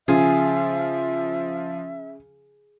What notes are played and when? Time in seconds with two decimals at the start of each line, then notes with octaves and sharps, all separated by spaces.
0.08 C#3 F3 F4 G#4 E5